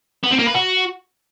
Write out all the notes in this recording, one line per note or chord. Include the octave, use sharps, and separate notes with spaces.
B3
C4
A#3
B4
F#4